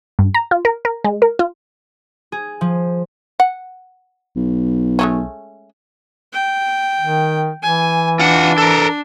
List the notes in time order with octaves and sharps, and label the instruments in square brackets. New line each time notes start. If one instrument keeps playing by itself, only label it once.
[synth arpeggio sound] G2
A#5
F4
A#4
A#4
G#3
A#4
F4
[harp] G#4
F3
[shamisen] F#5
[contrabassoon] B1
[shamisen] G#3 A3 C#4
[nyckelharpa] G5
[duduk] D#3
[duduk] E3 [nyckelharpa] G#5
[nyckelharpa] D4 [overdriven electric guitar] F4 F#5
[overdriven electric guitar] A4 A#4